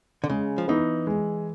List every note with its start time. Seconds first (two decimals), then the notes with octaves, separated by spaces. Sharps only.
0.24 D3
0.29 C#3 G#3
0.58 F3
0.68 E3 B3 D#4
1.07 G#3